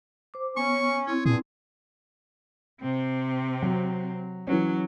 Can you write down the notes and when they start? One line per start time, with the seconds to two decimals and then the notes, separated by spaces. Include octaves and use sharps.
0.34 C5 D6
0.57 B3 C#4 C#6
1.07 C4 E4 C#5
1.26 G2 A#2 G#4
2.82 C3 C4
3.62 F#3
4.47 E3 F#3 C#4